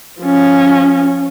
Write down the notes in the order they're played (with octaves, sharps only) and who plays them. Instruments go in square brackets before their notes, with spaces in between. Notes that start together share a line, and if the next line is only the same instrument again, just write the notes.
[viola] F3 C#4